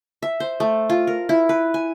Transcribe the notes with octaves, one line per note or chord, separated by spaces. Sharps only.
E5
C5
A3
F4
A#4
E4
B4
G#5